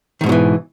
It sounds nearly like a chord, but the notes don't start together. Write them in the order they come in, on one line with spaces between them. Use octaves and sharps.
D#3 G#2 B2 F#3 E3